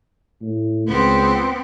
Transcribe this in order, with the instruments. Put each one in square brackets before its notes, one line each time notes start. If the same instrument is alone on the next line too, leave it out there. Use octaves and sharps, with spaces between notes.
[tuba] A2
[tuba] C#2 [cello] B3 C4